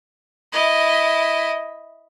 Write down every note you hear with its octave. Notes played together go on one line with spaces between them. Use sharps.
E4 D#5